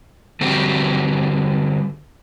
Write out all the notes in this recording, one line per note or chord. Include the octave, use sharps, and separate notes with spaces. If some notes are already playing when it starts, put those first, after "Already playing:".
D3 G3 C4 F#4 G4